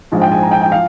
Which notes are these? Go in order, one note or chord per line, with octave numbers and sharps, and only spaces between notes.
A#1 G#2 F3 G#3
G5
G#5
A#5
G5
G5
F3 F5